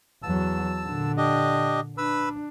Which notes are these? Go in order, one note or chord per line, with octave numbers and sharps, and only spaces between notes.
E2 F#3 A5 E6
A#2 D3
D4 G4 D#5
D4 B4 B5 E6